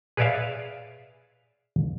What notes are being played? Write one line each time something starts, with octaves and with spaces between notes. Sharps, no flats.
G#4 B4 C#5 D5 E5 F5